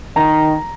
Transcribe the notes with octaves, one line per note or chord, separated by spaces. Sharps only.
D#3 A#5